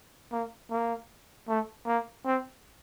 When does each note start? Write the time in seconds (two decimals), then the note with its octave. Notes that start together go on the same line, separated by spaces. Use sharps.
0.31 A#3
0.71 A#3
1.48 A3
1.87 A#3
2.26 C4